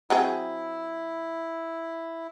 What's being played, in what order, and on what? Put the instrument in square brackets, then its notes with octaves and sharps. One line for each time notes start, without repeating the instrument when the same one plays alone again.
[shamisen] F#3 C4 G#4 [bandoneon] E4